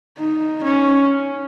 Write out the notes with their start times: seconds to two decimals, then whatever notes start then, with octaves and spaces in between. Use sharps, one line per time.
0.18 D#4
0.63 C#4